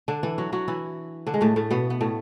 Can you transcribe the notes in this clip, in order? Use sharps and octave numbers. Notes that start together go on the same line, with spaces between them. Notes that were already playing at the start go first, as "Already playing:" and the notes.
D3 D4
E3 E4
F#3 F#4
F#3 F#4
E3 E4
D3 D4
G#3
A2 A3
A2 A3
B2 B3
B3
A2 A3